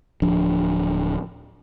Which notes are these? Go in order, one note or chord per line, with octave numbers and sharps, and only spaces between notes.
D1 F3 D4